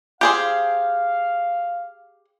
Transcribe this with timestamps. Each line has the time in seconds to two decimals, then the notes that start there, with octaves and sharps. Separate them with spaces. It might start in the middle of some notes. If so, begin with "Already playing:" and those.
0.21 G4 G#4 C5 F5